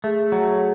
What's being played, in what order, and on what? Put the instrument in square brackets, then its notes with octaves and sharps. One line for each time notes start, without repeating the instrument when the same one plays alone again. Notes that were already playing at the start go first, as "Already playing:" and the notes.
[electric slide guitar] A3 [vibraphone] G#4
[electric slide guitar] F#3